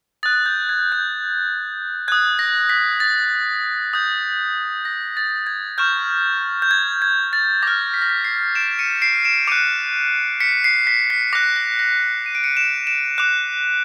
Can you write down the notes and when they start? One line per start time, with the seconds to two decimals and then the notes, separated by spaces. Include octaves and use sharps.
0.23 D#6 F#6 A6
0.46 G6
0.69 G#6
0.92 G6
2.08 D#6 F#6 G#6
2.39 A#6
2.69 B6
3.00 A6
3.93 D#6 G6
4.85 A#6
5.17 A6
5.47 G#6
5.78 C#6 F6 G6
6.62 G6
6.71 G#6
7.02 G#6
7.33 A6
7.63 D6 F6 A#6
7.94 B6
8.02 A#6
8.10 B6
8.25 C7
8.55 D7 E7
8.79 C#7 D#7
9.02 C7 D7
9.24 D7 E7
9.47 D6 F#6 C#7 D#7
10.40 B6 C#7
10.64 C7
10.87 B6
11.10 B6
11.33 D6 F#6 A#6
11.56 A#6
11.79 A#6
12.03 A#6
12.26 D#7
12.35 D7
12.44 C#7 D#7
12.57 D7 E7
12.87 D7 E7
13.18 D6 F#6